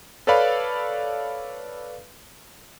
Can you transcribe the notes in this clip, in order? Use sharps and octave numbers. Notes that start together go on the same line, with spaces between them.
A4 B4 C#5 D5 F5 B5